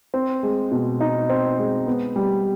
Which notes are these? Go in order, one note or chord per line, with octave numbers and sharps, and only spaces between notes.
C4
G#3
B2
D#4
C4
G#3
B3
G3